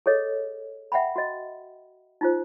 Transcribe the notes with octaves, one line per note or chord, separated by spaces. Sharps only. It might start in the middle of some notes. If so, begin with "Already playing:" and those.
G#4 A4 C#5 D#5
E5 F#5 G5 B5
F#4 D#5
D#4 F4 C5